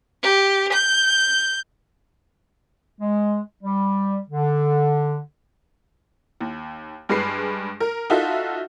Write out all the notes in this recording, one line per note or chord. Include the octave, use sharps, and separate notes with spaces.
G4
G6
G#3
G3
D3
D#2
G2 G#3 B4 C7
A#4
D#4 F4 F#4 A4 E5 F5